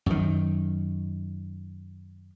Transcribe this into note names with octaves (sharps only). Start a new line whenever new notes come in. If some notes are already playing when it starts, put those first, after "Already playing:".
F#2 D#3